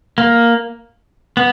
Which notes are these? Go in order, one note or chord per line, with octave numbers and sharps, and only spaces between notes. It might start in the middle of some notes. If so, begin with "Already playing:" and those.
A#3
B3